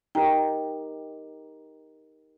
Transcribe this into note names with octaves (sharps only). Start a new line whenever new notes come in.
D#4 G4 A#4 G5 A#5